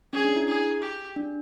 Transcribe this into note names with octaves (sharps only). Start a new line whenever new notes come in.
C#4 G#4
D4
E4
G#4
G4
D4